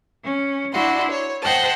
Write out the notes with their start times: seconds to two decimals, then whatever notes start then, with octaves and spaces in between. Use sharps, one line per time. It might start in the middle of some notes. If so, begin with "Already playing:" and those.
0.24 C#4
0.71 D4 E4 F#4 C6
1.10 C#5
1.42 C5 D#5 F#5 G5 A5